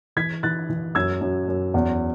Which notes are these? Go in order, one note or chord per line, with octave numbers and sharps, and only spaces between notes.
E3 G#6 B6
E3 F#6 A6
E3
F#2 E6 G#6
F#2
F#2
E2